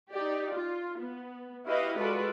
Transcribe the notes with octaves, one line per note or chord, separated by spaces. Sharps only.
D#4 G4 D5
F4
B3
E4 F#4 G4 B4 D#5 F5
G#3 F4 F#4 A4 B4 D5